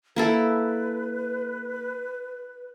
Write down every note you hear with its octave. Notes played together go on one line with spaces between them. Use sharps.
A#3 E4 A4 B4